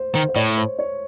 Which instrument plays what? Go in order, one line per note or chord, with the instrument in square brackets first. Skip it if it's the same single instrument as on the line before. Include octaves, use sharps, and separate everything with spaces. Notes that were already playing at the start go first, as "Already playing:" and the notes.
Already playing: [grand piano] C5
[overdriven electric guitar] D#3 [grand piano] C5
[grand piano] C5
[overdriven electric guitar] A2 [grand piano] C#5
[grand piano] C5
C#5